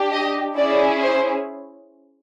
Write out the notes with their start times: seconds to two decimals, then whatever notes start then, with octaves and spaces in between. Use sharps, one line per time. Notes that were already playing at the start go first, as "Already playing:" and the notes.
Already playing: D4 G4
0.11 D#5
0.56 C#4 E4 G#4 D5
1.02 C5